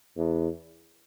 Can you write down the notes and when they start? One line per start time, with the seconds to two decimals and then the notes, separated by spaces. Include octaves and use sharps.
0.17 E2